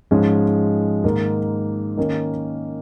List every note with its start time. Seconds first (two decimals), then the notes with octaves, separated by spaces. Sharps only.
0.11 G#2 F3 G#3 C#4
1.04 G#2 D#3 A#3
1.97 D#3 A#3 C#4